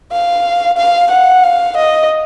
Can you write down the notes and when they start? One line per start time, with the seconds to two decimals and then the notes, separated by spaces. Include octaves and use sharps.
0.12 F5
0.78 F5
1.11 F#5
1.44 F5
1.77 D#5